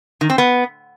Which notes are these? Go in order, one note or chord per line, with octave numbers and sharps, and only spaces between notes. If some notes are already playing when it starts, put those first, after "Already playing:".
D#3
C4
B3